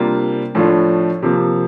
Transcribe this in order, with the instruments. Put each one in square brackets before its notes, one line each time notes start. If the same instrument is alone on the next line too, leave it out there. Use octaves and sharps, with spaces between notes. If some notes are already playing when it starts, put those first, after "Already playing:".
Already playing: [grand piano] C3 G3 A#3 D4 F4
A2 F3 A3 D4 F4
C3 F3 A#3